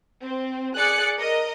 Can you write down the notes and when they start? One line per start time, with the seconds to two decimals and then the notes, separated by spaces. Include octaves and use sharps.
0.24 C4
0.76 G#4 D5 F#6 C#7
1.19 A#4 D#5